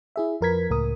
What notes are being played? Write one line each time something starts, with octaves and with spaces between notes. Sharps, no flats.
E4 G#4 E5
F2 F3 A#4 B4 G#6 B6
C#2 A2 A#4 D#6